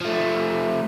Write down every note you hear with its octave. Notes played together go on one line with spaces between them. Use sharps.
F3 A3